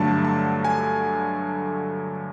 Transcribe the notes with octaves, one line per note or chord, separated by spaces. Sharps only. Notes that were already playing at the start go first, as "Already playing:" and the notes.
Already playing: G2 D3 F#3 A3 A5
A5
G#5